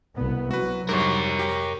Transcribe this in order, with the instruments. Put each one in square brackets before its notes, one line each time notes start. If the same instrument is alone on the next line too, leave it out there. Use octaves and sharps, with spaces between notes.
[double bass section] C2 B2 B3
[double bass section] C3 F#3 [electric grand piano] F#4 B4
[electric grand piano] G#2 G3 [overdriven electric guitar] A#4 C#5
[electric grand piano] G4 G5